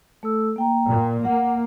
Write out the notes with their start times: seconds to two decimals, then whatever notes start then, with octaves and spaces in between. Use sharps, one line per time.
0.23 A3 A4 E6
0.56 A#3 G5 A#5
0.88 A#2
1.25 A#3 F#5